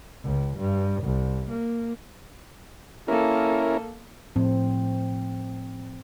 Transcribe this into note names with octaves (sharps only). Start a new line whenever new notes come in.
C#2
G2
C2
A#3
A#3 C#4 E4 A4 A#4
A2 F3 C4